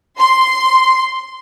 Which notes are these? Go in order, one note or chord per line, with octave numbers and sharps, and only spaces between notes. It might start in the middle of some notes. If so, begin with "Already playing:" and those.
C6